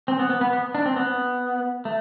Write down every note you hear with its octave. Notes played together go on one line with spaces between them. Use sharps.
C4
B3
B3
B3
B3
D4
C4
B3
A3